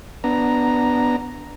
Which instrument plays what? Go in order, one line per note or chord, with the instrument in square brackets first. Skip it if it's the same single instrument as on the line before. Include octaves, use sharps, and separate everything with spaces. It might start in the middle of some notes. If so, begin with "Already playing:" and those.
[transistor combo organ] B3 D4 A#5